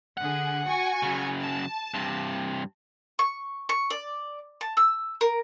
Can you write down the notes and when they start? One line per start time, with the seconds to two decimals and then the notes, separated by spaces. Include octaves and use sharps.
0.17 D3 G#4 F#5
0.66 F#4 G#5 C#6
1.03 F#2 C#3
1.42 A5
1.94 G2 C3
3.19 C#6
3.69 C#6
3.90 D5
4.61 A5
4.77 E6
5.21 A#4